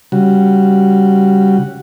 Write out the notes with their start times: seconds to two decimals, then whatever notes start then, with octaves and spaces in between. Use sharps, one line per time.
0.12 C#3 G3 F#4